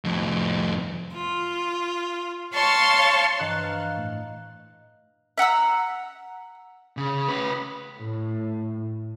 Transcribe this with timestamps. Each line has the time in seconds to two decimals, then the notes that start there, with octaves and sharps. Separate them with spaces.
0.05 F2 A2
1.14 F4
2.53 C#5 F5 A5 C6 C#6
3.39 G2 E3 F3 D#5 A#5 F#6
3.63 F5 F6
3.97 A2
5.38 E5 F#5 A#5 E6
6.97 C#3
7.28 C#4 B4
7.95 A2